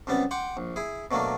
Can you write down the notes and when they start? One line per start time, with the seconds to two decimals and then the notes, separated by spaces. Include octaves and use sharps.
0.07 C2 F#2 G3 B3 A5
0.31 F#5 G5 C6 D6
0.57 A#1
0.76 E4 G#4
1.11 B2 F#3 A3 A#3 D4